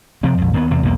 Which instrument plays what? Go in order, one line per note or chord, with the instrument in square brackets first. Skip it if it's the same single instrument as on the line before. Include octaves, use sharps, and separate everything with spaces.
[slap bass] C3 F3 C4
A#1 F2
D#2 B3
E2 C3
B1 E2 A#3